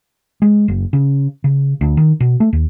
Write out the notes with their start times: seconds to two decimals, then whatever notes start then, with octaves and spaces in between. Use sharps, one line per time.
0.42 G#3
0.68 F#1
0.93 C#3
1.44 C#3
1.81 D2
1.97 D#3
2.20 B2
2.40 A3
2.53 D#2